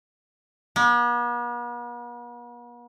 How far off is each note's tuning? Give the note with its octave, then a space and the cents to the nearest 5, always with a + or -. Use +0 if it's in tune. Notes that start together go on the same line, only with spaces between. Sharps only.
B3 -45